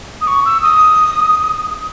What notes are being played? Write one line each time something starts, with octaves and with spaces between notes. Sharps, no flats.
D#6
C#6
E6
D#6